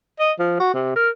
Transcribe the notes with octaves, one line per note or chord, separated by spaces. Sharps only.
D#5
F3
F#4
C3
A#4